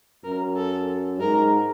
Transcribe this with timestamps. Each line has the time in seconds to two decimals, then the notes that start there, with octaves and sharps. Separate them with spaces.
0.24 F#2 A#4
0.56 A4
1.21 G#2 A#4